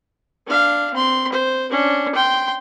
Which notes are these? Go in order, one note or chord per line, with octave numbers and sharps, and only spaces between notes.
D4 F5
C4 C6
C5
C#4 D4
G5 C6